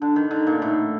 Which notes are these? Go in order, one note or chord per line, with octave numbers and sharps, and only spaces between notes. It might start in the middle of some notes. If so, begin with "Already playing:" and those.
D3 D4
D#3
D3 D#4
A#2
A2 D#4